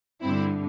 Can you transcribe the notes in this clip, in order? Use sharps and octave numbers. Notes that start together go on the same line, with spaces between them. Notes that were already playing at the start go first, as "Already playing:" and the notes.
G2 D3 C4 E4